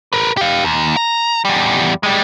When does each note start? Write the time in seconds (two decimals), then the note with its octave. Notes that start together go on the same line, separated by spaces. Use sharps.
0.13 A#4 B4
0.37 G4 F5
0.65 D#2
0.97 A#5
1.45 E2 G3
2.03 G3 G#3